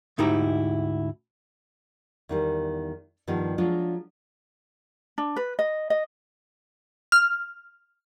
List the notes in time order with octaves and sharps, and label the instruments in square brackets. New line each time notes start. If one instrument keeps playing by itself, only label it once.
[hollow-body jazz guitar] D2 G#2 D#4 E4 G4 A#5
[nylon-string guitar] E2 D#3 G3
G2 D#3 F3 G3 B3
F3 F#3 G#3 B3 D4 F4
[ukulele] D4
B4
D#5
D#5
[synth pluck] F6